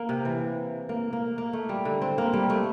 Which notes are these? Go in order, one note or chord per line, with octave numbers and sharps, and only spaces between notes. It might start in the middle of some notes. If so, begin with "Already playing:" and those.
Already playing: A#3
C3
E3
A#3
A#3
A#3
A3
G3
D3
C4
A#3
G3
A3